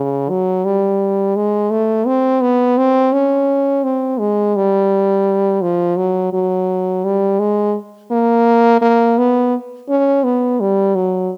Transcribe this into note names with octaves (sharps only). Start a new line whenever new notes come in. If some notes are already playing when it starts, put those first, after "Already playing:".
Already playing: C#3
F#3
G3
G#3
A3
C4
B3
C4
C#4
C4
G#3
G3
F3
F#3
F#3
G3
G#3
A#3
A#3
B3
C#4
B3
G3
F#3